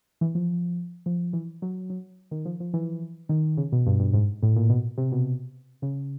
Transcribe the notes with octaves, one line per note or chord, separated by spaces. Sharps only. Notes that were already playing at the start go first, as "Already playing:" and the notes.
E3
F3
F3
E3
F#3
F#3
D#3
F3
F3
E3
D#3
C#3
B2
G2
G2
G#2
A2
A#2
B2
C3
B2
C#3